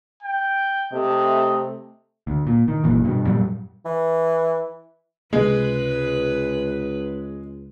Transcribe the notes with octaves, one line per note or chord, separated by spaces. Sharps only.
G5
C3 A3 D#5
D2
A#2
D#3
F#1 F#2 A#2 E3
G2 B2
F#2 A#2 F#3 G3
E3
C#2 C3 G#3 B3 B4